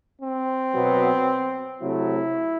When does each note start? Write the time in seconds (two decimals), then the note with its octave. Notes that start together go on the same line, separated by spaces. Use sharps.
0.21 C4
0.75 B2 F#3 B3
1.82 C3 F#3 A3 E4